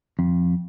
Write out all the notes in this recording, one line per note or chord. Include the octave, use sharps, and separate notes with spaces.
F2